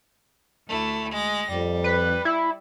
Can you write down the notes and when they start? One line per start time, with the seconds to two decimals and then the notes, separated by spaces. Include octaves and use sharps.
0.68 D2 A3 E4
1.11 G#3 A#6
1.51 F2 G3
1.84 B4
2.25 E4